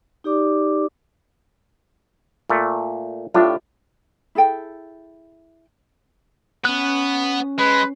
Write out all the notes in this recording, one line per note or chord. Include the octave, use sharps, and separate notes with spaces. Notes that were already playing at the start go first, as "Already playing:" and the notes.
D#4 G4 D5 D6
A#2 A3
A2 D4 F4 G4 E5
E4 G#4 A4 G5
B3 C#4 F#6
G#3 B4